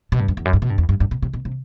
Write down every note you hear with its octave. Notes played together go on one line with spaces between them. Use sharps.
B2
G2
F#2
E2
F#2
G2
B2
G2
E2
G2
G2
B2
C3
B2
C3